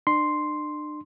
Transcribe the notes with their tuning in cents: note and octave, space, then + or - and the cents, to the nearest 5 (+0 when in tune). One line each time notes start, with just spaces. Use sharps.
D4 +40 C6 +0